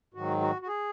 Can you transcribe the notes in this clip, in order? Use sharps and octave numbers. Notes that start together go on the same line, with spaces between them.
G#2 D#3 F#3 F#4
F#4
F#4
G#4